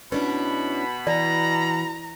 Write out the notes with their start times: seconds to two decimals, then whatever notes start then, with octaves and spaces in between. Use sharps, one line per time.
0.12 B2 C#4 D4 E4 B4 B5
1.07 E3 D5 A#5